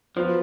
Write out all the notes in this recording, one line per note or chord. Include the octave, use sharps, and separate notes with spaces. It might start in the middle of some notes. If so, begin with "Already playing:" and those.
F3 F#3 B3 F4